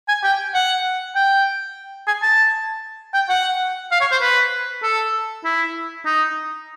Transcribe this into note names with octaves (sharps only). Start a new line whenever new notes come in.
G#5
G5
F#5
G5
G#5
A5
G5
F#5
F5
C#5
C5
B4
A4
E4
D#4